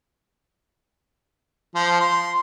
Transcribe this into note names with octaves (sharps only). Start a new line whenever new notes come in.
F3
C6